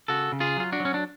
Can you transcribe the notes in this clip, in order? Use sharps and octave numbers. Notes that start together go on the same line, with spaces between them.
C#3 F#4 A4
C#3
F4 G#4
F#3 F4
D4 F#4
F#3
C#4
D4